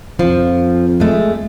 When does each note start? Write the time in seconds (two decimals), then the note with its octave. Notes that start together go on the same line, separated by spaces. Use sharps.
0.19 F2 F3
1.00 G#3 A3